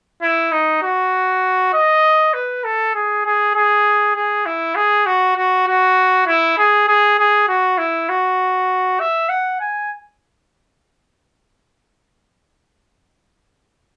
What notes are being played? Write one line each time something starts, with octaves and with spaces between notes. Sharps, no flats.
E4
D#4
F#4
D#5
B4
A4
G#4
G#4
G#4
G#4
E4
G#4
F#4
F#4
F#4
E4
G#4
G#4
G#4
F#4
E4
F#4
E5
F#5
G#5